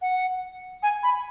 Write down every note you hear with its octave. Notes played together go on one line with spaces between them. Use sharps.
F#5
G#5
B5